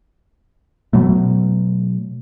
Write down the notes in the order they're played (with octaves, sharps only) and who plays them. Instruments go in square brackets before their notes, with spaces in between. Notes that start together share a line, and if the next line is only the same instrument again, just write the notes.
[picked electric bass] B2 F#3 A3